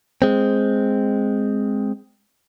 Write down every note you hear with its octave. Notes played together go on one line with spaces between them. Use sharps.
G#3 C4